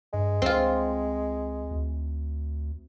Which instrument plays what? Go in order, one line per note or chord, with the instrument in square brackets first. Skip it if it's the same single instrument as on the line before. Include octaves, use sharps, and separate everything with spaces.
[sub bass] G2 [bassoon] G#3
[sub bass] C#2 [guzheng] C4 F4
[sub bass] D2